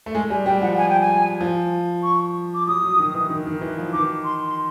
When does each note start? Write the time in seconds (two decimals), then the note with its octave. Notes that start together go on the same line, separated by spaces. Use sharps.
0.06 A3
0.15 G#3 G#5
0.30 G3 G#5
0.46 G3 G5
0.61 F3 F#5
0.77 G#5
0.89 G5
1.00 G#5
1.41 F3
2.03 C#6
2.54 D6
2.67 F#3 D#6
2.83 F#3
2.99 D#3
3.14 E3
3.30 D#3
3.46 D#3
3.61 E3
3.78 F3
3.93 D#3 D6
4.24 C6
4.47 C6